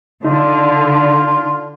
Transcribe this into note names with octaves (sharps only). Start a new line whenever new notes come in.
D3 D#4 F4